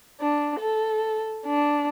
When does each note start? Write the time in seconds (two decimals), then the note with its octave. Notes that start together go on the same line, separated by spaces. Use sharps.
0.20 D4
0.59 A4
1.47 D4